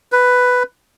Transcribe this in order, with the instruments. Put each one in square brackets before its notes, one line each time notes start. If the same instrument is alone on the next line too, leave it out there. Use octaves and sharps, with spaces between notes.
[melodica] B4